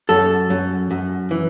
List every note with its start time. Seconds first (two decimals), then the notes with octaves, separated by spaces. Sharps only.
0.09 F#2 A4
0.50 F#2
0.91 F#2
1.31 E3